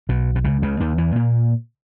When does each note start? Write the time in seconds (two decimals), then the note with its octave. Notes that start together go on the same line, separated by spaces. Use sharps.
0.09 B1 B2
0.36 B2
0.44 C#2 C#3
0.62 C#2 C#3
0.80 D#2 D#3
0.98 E2 E3
1.15 A#2 A#3